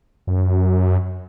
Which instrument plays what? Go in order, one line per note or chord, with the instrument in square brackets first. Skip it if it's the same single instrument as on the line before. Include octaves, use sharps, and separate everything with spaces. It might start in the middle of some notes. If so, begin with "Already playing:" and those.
[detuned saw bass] F#2